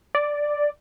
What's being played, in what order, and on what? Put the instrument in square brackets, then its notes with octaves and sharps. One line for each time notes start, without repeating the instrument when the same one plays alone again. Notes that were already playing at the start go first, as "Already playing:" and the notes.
[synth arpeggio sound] D5